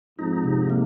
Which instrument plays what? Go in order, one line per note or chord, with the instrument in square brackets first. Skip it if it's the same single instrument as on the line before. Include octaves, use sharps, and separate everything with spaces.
[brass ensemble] F2 G#2 [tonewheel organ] D#4
[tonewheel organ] C3
A#3